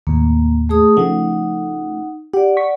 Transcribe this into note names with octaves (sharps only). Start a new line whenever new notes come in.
D#2 A2 A#3
A3 G#4 D#6
C#3 F3 A3 D#4 F#5
G4 D5 F#5
C#6 B6